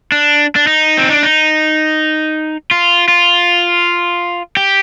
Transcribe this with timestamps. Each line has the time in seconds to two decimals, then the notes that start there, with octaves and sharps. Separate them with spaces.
0.12 D4
0.56 D4
0.67 D#4
0.97 C4
1.10 D4
1.23 D#4
2.71 F4
3.08 F4
4.57 G4